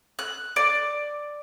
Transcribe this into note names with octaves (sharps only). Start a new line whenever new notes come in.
F#6
D5